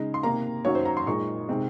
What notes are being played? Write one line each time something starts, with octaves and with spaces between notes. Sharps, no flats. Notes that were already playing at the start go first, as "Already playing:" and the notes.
Already playing: C#3 G#3 D#4
C6
C3 D#3 A#3 A#5
F#2 D#3 F#3 C#5
C5
A#5
C6
A#2 G#3 D#4 C#6
C3 D#3 G#3 C4